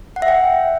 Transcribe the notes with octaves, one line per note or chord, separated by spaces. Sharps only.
F#5
E5
G5